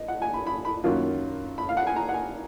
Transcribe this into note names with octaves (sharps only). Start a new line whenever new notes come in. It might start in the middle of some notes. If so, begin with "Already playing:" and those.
Already playing: D#5
F#5
G#5
B5
B5
B5
F#2 D#3 F#3 A#3 F4
B5
F5
F#5
G#5
A#5
F#5
G#5